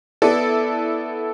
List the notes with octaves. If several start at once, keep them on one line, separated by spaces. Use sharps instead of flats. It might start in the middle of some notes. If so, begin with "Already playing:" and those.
B3 E4 A4 D5